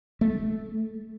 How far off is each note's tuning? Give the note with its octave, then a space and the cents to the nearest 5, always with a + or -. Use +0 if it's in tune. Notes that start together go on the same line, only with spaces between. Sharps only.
A3 -15